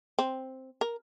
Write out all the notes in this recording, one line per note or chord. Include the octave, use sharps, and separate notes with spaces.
C4
A#4